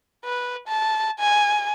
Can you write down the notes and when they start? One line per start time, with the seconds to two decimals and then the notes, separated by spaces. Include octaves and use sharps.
0.25 B4
0.68 A5
1.19 G#5